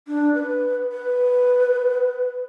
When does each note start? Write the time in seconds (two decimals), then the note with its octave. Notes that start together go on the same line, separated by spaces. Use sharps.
0.08 D4
0.35 B4
0.92 B4